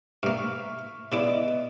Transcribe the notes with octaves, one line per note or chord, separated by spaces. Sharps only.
G2 A#3 E5 C#6 F6
C#3 B3 E4 D5 D6
D#5